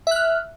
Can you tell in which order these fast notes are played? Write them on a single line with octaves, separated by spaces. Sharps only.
E5 F#6 F6